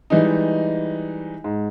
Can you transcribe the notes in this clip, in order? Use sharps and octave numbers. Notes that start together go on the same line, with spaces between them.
E3 G3 G#3 D#4
G#2